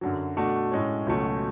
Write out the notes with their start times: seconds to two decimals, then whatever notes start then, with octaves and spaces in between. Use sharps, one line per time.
0.01 F#2 D3 F#3
0.37 B2 A3 D4 F#4
0.72 A2 G#3 C#4
1.06 C#2 B2 F#3 A3 C#4